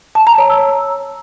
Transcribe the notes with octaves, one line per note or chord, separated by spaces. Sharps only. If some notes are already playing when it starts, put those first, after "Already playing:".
A5
A#5
C#5
E6